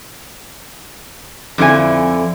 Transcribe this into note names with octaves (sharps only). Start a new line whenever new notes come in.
F2 D3 E4 F4 G#5